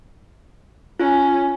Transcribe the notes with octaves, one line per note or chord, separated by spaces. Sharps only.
C#4 F4